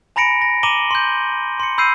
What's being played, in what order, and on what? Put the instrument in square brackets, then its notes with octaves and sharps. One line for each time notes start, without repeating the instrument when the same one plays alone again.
[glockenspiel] G#5 A#5 B5 A#6 C#7 D7
A#6
A#5 D6 D#7 F#7 G7
C6 G6
C6 C#7
B5 E6 G6 C7 D#7